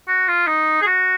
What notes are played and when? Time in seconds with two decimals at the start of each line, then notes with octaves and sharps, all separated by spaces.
0.08 F#4
0.28 F4
0.47 D#4
0.82 G#4
0.87 F#4